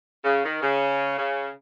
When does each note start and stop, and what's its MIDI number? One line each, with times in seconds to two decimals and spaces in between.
0.24 0.43 49
0.44 0.59 51
0.62 1.17 49
1.18 1.50 49